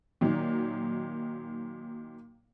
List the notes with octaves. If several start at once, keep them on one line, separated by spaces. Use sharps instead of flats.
A#2 D#3 F#3